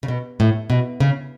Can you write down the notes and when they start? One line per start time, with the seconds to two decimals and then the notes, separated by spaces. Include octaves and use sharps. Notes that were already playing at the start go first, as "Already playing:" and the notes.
0.03 C#3
0.08 B2
0.40 A2
0.70 B2
1.00 C#3